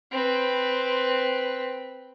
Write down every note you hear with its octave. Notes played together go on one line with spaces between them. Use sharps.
C4 B4